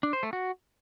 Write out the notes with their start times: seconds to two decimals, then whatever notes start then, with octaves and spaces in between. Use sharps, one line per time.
0.03 D4
0.13 C5
0.23 A3
0.33 F#4